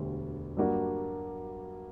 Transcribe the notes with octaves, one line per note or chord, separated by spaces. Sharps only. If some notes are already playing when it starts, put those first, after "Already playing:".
Already playing: E1 D2 D3 G3
G2 F#3 A#3 D4 F#4